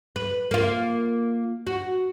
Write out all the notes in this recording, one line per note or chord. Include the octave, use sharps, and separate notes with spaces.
B4
A#3 F4
F#4